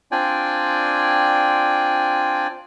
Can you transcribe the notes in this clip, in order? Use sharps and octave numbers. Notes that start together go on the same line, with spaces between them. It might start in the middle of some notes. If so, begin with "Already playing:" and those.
C4 D4 F4 D5 G5 G#5